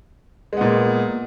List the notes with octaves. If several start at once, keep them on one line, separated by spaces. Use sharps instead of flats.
A#2 G#3 B3